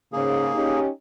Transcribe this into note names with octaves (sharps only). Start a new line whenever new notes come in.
G#2 C#3 A#3 G#4
C#4 D#4 G4